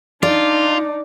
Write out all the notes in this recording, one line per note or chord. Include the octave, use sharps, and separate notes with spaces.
D4 D#4 F4 D5